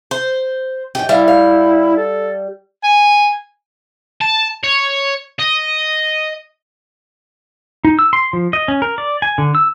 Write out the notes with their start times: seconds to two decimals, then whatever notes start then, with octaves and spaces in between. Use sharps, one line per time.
0.11 C5
0.95 F#2 C3 G4 D#5
1.09 G3 E4 E5 F5
1.28 F5
1.97 A4
2.84 G#5
4.21 A5
4.63 C#5
5.39 D#5
7.85 D#4
7.99 E6
8.13 C6
8.33 F3
8.53 D#5
8.68 C#4
8.82 A#4
8.98 D5
9.22 G#5
9.38 D3
9.55 E6